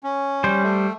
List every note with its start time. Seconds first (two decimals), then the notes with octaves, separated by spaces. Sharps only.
0.04 C#4
0.44 G3 C5
0.63 A3